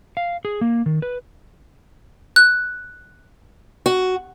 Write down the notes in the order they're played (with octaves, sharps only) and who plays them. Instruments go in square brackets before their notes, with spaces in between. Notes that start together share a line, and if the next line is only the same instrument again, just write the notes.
[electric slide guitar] F5
G#4
A#3
D#3
B4
[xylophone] F#6
[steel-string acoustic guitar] F#4